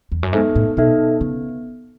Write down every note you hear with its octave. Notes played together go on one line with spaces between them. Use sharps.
E2
F#2
G#2 B3 D#4 A4 E5
A2
B2 B3 D#4 A4 E5
C#3 B3